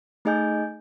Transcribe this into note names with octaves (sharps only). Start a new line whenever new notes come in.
A3 D#4 G#4 D#5 G#5 G6